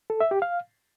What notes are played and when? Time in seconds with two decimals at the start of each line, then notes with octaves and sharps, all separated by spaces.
0.10 A4
0.20 E5
0.31 G4
0.42 F5